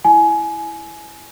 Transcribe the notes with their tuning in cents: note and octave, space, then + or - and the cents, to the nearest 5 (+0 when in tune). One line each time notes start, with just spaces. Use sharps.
E4 +0 G#5 +20